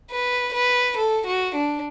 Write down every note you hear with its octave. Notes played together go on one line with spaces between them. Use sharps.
B4
B4
A4
F#4
D4